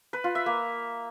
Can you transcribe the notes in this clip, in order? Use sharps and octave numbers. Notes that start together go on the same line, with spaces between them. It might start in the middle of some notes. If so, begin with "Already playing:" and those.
B4
F4
E5
A#3